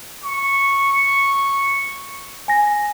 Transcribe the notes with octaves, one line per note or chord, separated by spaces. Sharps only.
C#6
G#5 A#6